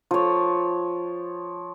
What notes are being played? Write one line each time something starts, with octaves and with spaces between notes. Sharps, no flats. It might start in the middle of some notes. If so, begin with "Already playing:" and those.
F3 C#5